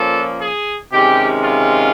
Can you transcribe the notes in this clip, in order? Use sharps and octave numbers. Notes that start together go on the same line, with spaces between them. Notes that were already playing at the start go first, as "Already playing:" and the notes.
Already playing: A#2 F3 A#3 C#4 F4 A4
G#4
C3 D#3 G#3 C#4 G4
F4